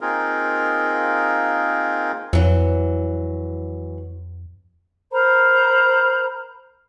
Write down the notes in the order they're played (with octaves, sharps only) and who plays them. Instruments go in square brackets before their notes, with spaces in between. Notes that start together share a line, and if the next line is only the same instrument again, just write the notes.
[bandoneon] A#3 C4 D#4 F4 G#4 A#4
[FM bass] F2 [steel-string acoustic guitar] E3 F#3
[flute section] A#4 C5 A#5 B5